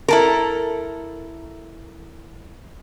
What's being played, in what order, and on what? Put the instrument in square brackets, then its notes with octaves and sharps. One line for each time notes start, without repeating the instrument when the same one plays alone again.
[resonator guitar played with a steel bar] E4 A4 A#4